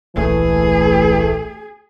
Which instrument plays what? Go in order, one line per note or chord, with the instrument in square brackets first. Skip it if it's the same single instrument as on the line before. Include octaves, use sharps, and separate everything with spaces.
[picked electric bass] D1 A#1 [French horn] E3 [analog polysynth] A3 [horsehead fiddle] G#4